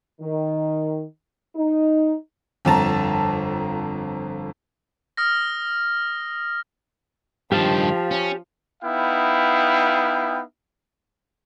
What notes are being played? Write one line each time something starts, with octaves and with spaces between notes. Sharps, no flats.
D#3
D#4
G1 F2 A5 A#5
D#6 F6 A#6
G2 D#3 F3 G4 F5 A5
C#4
B3 D#4 E4 F5 G5